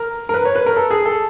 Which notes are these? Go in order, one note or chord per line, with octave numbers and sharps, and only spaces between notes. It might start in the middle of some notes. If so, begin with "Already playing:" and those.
Already playing: A#4
A#4
B4
C#5
B4
A#4
A4
G#4
A4